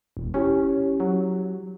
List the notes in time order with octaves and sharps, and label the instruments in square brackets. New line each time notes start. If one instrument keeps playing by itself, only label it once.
[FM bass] E1
[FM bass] C#4 [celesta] E4 G4 C#5
[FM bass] F#3